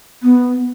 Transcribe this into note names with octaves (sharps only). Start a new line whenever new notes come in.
B3